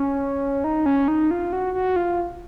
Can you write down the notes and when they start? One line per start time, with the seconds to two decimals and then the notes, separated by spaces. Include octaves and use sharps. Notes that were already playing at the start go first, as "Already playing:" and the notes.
Already playing: C#4
0.64 D#4
0.86 C#4
1.08 D#4
1.31 F4
1.53 F#4
1.74 F#4
1.96 F4